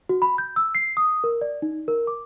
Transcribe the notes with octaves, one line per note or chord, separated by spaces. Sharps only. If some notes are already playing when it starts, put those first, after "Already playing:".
F#4
B5
G6
E6
C7
D#6
A#4
D5
D#4
A#4
D6